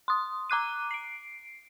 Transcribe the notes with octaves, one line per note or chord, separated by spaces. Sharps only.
C6 D#6
A#5 D6 F#6 D#7
C7 D7